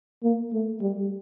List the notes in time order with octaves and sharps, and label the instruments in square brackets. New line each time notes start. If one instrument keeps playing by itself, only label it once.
[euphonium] A#3
A3
G3